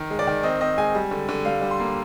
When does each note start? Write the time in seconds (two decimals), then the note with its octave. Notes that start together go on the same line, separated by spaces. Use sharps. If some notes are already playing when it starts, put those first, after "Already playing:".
Already playing: D#3
0.10 G#3
0.19 D5
0.27 D#3
0.43 C4 D#5
0.61 C4 D#5
0.77 G#3 G#5
0.95 G3
1.11 D3
1.29 D3
1.45 G3 F5
1.62 G3
1.71 C6
1.80 A#3